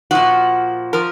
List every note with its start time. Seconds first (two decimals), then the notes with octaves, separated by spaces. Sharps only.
0.11 A#2 F3 F#4
0.93 F3 A#4